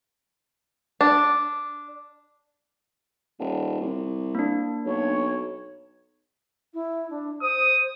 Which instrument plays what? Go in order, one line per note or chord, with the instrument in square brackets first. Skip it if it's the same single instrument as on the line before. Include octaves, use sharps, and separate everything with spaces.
[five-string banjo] D4
[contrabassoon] D#1
C2
[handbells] A#3 D4
[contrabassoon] B1 [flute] C#5
[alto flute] E4
D4
[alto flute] C5 [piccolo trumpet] D#6